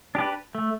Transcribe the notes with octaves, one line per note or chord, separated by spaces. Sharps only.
D4 G4 B4
A3